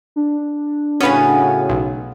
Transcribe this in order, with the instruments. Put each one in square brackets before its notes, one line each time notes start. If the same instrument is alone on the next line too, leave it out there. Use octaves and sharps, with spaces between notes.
[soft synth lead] D4
[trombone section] A2 C#3 F#4 [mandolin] B3 F5 G#5 [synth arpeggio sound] C#4 B4
[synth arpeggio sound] B1